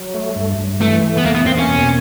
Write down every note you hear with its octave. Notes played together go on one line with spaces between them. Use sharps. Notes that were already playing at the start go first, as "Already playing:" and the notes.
Already playing: F#3
A3
G2
G2
E3 A3
A3
B3
E2 A#3
B3
A#3 C4
C#4
B2